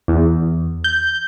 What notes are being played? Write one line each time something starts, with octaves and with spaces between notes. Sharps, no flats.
E2
G6